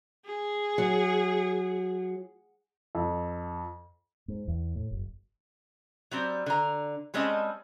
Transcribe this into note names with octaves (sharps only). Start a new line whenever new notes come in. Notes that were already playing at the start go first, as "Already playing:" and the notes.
G#4
F#3
F2
G#2
E2
A2
F#1
F#3 G3 C4 D5
D3 A#5
G3 G#3 C4 C#4 D#5 A5